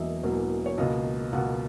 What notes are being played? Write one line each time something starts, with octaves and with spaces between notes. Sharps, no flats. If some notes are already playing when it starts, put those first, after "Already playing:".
Already playing: E1 E2 B2 F#3 A#3 D#5 E5
E1 E2 B2 F#3 A#3
C#5
C#2 B2 A#3 D#5
C#2 B2 A#3 F#5